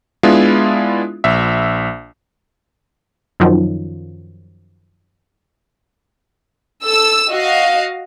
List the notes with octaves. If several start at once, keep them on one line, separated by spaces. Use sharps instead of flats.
G#3 B3 D4 E4 F4
A#1 E5
F#2 D#3 F3 F#3
A4 E6
F#4 D#5 F5